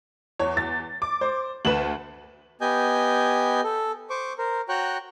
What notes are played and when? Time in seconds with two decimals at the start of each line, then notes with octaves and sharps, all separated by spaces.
0.39 E2 C#5
0.57 A6
1.02 D6
1.21 C5
1.65 D2 B4 E7 F#7
2.61 B3 G4 D#5 G#5 G6
3.64 A4
4.10 C5 C#6 D6
4.38 A#4 C5
4.69 F#4 C#5 G5 A#5 C#6 F#6